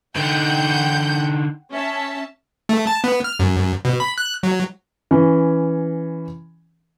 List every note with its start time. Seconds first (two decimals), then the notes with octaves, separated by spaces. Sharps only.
0.16 D3 D#4 F#5 G5 G6
1.72 C#4 E5 A5
2.69 A3
2.87 A5
3.04 B3
3.24 F6
3.40 F#2
3.85 B2
4.00 B5
4.18 F#6
4.43 F#3
5.11 E3 C#4